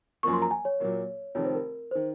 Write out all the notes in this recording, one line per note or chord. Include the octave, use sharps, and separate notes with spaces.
F#2 F3 A#3 C#6
C6
A#5
G#5
C#5
A#2 F#3 A#3
F1 F2 D#3 C#5
C5
A#4
D#3 C5